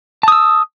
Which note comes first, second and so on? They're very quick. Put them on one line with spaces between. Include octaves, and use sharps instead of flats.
A5 D#6 E6